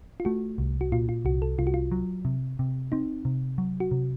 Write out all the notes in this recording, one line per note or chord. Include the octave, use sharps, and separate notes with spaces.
F4
A3 F#4
C2
F#4
A#2 F4
F4
C2 F#4
A4
C2 F4
F#4
F4
F#3
C3
C3
C4 D#4
C3
F#3
F#4
C3